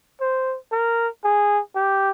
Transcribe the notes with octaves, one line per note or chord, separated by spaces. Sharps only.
C5
A#4
G#4
G4